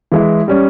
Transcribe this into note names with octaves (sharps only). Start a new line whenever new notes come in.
E3 G#3 E4
G3 C#4